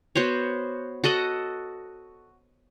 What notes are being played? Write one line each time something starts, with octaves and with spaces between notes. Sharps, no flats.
B3 F#4 C5 C#5
F#4 A4 D#5 F#5